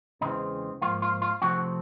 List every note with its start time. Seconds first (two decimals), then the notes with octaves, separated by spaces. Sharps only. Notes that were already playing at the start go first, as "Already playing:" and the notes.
0.21 E2 C#3 E3 G#3 C4 D#4
0.82 G#2 F3 A#3 F4
1.02 F4
1.22 F4
1.42 F2 C3 F3 A3 C4 F#4